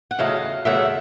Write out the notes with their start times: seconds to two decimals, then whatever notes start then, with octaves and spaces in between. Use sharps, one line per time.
0.11 F#5
0.19 E2 C#3 F#3 A3 D#5 F5
0.65 E2 C#3 F#3 A3 E5 F#5